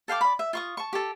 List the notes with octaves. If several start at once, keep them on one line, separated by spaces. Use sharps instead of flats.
A4 F5 G5 D6
D5 B5
E5
F4 C#6 D#6
A5 C#6
G4 A4